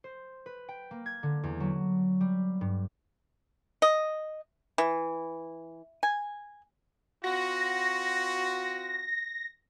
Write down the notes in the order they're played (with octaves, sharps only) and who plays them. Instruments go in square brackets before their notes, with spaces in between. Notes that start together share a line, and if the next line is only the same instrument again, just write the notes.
[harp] C5
B4
G5
A#3
G#6
D3
E2
F#3
G3
G2
[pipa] D#5
E3
G#5
[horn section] C4 F4 F#4 [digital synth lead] A#6